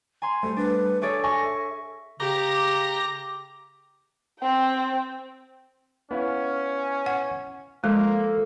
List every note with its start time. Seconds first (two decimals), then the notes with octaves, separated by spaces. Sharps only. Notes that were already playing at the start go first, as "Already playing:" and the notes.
0.22 G#5 A#5 C6
0.43 G3 A3 C5
0.57 D4 B4
1.02 G#4 A4 C#5 D5 E5
1.24 G#5 C#6 A#6
1.45 E5
2.20 C#3 G4 A#5 D6
4.40 C4 G5
6.11 B3 C#4 E4 F5
7.06 F#5
7.84 F3 G#3 A#3 A4 C5 E5